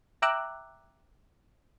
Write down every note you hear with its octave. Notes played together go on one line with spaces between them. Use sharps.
E5 G5 A#5 D6 E6 F#6